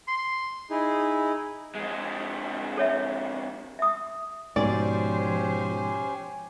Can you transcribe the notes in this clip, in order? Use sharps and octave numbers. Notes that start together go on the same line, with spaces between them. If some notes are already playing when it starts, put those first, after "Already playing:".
C6
D#4 E4 G#4
F2 G#3
A4 C#5 E5
E5 D#6
G#2 B2 F3 C#4 G4 C5 D5 G#5